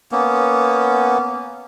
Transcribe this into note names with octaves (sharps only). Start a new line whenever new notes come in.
A#3 B3 C#4